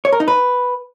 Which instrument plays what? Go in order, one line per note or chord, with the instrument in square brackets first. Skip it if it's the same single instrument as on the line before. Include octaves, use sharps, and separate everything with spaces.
[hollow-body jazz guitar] C#5
A#4
D#4
B4